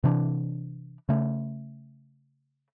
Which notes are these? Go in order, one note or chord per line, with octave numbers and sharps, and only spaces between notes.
C3 E3 D4
C#3 A3